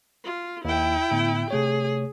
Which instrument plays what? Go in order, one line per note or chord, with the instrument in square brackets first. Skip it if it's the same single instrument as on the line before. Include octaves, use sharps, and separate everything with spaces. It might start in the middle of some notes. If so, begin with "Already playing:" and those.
[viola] F4
[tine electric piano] D#2 [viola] E4 G5
[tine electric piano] A2 D3 B3
[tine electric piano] C3 A3 C#5 [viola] G#4